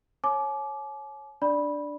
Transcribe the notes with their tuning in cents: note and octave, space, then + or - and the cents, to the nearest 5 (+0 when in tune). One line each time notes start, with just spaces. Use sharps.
C#5 -20 G#5 +45 D6 +0
D4 +0 D5 +0 B5 -10